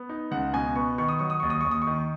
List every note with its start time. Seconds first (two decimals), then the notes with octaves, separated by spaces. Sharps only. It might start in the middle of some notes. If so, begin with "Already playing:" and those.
Already playing: B3
0.09 D#4
0.31 C#2 F#5
0.53 B2 G#5
0.76 B3 C#6
0.98 D#3 C#6
1.08 D#6
1.19 F#3 C#6
1.30 D#6
1.40 D#2 C#6
1.50 D#6
1.61 D#2 C#6
1.71 D#6
1.82 C#6
1.87 D#3